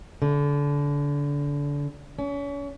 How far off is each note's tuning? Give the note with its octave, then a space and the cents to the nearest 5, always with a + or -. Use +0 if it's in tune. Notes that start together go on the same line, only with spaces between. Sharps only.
D3 -30
C#4 +35